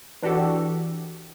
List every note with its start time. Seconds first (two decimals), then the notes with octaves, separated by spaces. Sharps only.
0.23 E3 D4 F#4 G4 A4